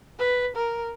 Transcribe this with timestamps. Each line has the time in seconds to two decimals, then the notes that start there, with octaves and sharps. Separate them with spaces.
0.19 B4
0.56 A#4